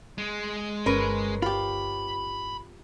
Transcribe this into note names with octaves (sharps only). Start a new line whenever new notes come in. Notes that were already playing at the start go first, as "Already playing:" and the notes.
G#3 G#4
G1 C#4 A#4 B4
F4 G4 B5